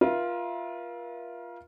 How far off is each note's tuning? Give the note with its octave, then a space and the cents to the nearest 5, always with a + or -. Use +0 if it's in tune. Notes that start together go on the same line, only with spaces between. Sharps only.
F4 +0 A#4 +45 E5 +0